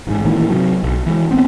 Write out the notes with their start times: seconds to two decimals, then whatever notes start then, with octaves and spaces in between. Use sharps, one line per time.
0.07 A1 G#2
0.25 A1 A#2 D#3 E3
0.49 C3 F#3
0.83 B1
1.06 E3 G#3
1.30 A1 B3 C4